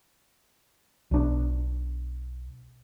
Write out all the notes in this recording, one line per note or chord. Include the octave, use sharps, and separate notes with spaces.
B1 D4